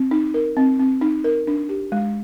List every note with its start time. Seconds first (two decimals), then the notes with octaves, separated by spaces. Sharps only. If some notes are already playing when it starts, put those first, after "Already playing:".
Already playing: C4
0.11 D#4
0.34 A#4
0.57 C4
0.79 C4
1.01 D#4
1.24 A#4
1.47 D4
1.69 G4
1.92 G#3